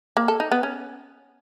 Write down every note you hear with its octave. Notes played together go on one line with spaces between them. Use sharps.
A#3
A4
D#4
B3
C#4